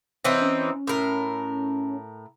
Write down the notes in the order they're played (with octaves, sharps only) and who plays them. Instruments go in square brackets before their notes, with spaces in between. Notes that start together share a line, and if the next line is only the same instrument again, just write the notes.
[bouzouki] E3 C4 D#4 [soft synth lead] C#5
[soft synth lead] C#4
[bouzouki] A2 A#4